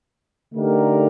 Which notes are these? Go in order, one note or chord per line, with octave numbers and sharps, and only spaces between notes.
D3 A3 D#4 G4 A#4